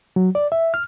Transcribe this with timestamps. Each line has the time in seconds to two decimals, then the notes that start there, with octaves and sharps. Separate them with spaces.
0.16 F#3
0.35 D5
0.52 E5
0.74 F6